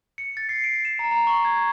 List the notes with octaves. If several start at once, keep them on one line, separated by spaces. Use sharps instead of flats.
C#7
A6
C7
D7
E7
A#5
A#5
C#6
G#6